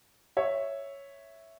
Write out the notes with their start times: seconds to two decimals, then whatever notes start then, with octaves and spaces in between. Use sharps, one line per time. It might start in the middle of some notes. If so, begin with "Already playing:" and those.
0.37 C#5 E5